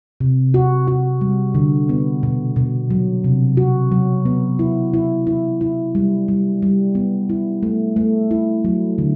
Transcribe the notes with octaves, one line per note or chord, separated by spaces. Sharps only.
C3
F#4
F#4
G3
D3
B3
B2
B2
F#3
C3
F#4
F#3
B3
E4
E4
E4
E4
G3
G3
G3
B3
E4
A3
A3
E4
F#3
D3